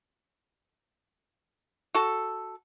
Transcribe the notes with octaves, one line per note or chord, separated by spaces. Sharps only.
F#4 A4